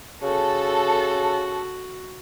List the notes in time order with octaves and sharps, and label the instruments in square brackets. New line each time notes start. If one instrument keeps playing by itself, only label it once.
[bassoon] C#3 [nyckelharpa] F#4 [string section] A4